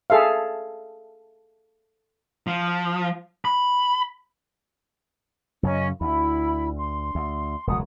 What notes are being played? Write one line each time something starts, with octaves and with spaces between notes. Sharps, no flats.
G#4 A4 E5 F5
F3
B5
F#2 C#3 F#3 C#4 D#5
D2 E4 B5
C6
D2
E1 C#2 F#3 F#5 D#6